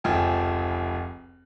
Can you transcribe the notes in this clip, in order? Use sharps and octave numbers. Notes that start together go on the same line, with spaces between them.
F1 C#2 F3 G5 G#5